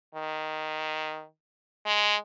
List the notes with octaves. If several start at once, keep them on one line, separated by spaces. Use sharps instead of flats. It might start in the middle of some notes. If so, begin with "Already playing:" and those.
D#3
G#3